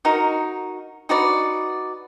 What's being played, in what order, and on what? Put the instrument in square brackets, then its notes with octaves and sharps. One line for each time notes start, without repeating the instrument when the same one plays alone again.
[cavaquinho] D#4 F#4 A#4
D#4 F#4 B4 D5